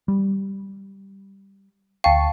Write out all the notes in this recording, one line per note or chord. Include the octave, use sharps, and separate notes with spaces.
G3
D2 F5 G5 A5 C#6